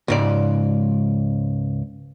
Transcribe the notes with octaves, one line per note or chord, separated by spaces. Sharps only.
C#2 G#2 D5